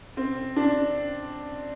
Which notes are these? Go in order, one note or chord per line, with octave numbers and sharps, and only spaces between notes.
C4
D4